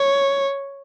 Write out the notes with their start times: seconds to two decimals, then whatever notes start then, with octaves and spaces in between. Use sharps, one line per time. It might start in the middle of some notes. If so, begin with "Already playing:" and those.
Already playing: C#5